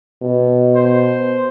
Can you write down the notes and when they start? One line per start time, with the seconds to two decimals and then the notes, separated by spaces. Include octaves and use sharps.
0.22 B2
0.76 C5